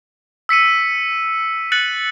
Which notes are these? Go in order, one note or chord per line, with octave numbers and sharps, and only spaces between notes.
E6 B6 C#7 D#7
F#6 A6 C#7 F#7